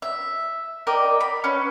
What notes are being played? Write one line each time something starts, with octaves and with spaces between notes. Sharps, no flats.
E5
A#4 D5 D#5 G5
B5
C#4 B4